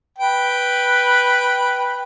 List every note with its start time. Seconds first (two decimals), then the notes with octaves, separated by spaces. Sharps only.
0.19 B4 G5